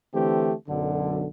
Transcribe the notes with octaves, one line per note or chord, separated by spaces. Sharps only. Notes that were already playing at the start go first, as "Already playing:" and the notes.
D3 E3 A3 C4 G4
B1 F#2 D3